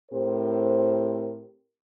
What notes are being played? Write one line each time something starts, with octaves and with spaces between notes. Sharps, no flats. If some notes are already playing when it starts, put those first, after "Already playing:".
A2 C4 G4 A#4 C5